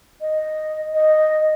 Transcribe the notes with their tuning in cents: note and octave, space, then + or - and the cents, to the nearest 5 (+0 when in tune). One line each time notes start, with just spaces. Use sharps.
D#5 -5
D#5 -5